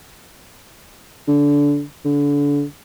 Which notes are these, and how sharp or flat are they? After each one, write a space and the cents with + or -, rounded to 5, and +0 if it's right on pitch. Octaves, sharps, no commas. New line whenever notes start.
D3 -20
D3 -30